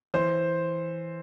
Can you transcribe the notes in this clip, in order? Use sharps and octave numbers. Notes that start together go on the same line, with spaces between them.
E3 C5